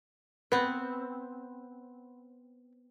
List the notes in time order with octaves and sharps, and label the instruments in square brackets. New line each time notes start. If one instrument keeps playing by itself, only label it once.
[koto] B3 C4 [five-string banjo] B4 [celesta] F#5 B5 C6